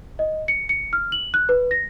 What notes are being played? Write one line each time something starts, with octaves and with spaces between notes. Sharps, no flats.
D#5
C#7
C#7
F6
F#7
F#6
B4
A#6